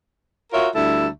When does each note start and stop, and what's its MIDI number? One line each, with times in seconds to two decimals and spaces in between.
0.53 0.68 65
0.53 0.68 66
0.53 0.68 70
0.53 0.68 73
0.53 0.68 76
0.75 1.08 38
0.75 1.08 55
0.75 1.08 64
0.75 1.08 69
0.75 1.08 76